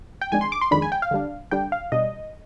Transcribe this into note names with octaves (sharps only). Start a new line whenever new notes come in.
G5
F2 D#3 G#3 D4 G#5
C6
D6
C6
F2 D#3 G#3 D4 B5
G#5
G5
F5
D3 G3 D4
D3 G3 D4 G5
F5
B2 G3 D4 D#5